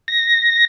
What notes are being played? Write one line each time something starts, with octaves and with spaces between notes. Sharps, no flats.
A#6